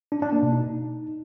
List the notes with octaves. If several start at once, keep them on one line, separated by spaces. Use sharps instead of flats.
D4
D4
A#3
B2
D#4